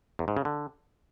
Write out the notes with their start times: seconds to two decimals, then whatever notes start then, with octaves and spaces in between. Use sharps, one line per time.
0.19 E2
0.28 G#2
0.37 C#3
0.45 D3